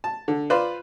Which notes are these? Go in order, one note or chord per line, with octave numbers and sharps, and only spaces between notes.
A5
D3
F4 B4 C5 D5